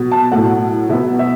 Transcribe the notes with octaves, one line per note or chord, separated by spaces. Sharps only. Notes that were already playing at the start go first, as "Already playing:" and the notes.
Already playing: B2 F#3 B3
A5
A2 F#3 A3 F#5
B2 F#3 B3 E5
E5